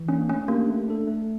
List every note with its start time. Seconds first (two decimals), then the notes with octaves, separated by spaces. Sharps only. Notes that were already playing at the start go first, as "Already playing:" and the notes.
Already playing: E3
0.09 A#3 C#4 D4
0.29 A3 C#4
0.48 A#3 D4 G4 A#4
0.69 A3
0.88 D4 A4
1.07 A3